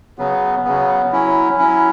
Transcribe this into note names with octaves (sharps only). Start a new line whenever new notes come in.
C#3 F#3 B3
C#3 F#3 B3
F#3 C#4 E4
F#3 C#4 E4